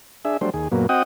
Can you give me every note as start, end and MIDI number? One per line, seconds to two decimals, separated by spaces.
0.25 0.37 62
0.25 0.37 68
0.25 0.37 76
0.41 0.50 54
0.41 0.50 55
0.41 0.50 57
0.41 0.50 62
0.41 0.50 72
0.54 0.68 39
0.54 0.68 68
0.72 0.87 42
0.72 0.87 46
0.72 0.87 54
0.72 0.87 58
0.72 0.87 59
0.89 1.03 60
0.89 1.03 66
0.89 1.03 75
0.89 1.03 78
0.89 1.03 79
0.89 1.03 87